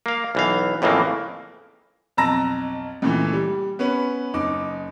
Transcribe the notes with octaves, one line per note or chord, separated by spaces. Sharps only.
A#3 F5
B1 E3 F5
F2 A2 C#3 E3 A#3
B1 F2 A5 A#5 E6 A#6
C#2 A#2 E3 A3
G3
B3 C#4 B4
F#1 D#4 D6